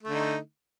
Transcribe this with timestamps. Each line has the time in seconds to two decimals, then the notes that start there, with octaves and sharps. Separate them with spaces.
0.03 A3
0.08 D3
0.12 D#4